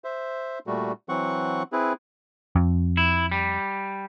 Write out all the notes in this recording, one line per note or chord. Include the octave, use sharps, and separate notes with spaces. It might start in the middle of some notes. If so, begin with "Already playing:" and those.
C5 E5
A#2 G3 A3 F#4
E3 F#3 C4 F#5 C#6
C4 E4 G#4 B4
F2
E4
G3